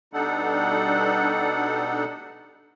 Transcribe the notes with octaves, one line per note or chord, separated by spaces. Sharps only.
B2 G3 D4 D#4 A4 F#5